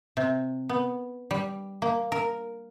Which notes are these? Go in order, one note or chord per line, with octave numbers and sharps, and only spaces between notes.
C3
B3
G3
A#3
A#4